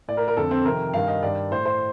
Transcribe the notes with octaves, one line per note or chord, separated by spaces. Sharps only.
A2 D5
A#4
A#4
F2 D3 A4
C4
F2 C3 D#3 A#4
G2 D#3 F5
D#5
G2 D#3 D5
A2 C5
C5